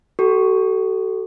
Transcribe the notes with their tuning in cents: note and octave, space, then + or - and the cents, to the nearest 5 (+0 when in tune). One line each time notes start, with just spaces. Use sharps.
F#4 +45 A4 +0 C#6 +5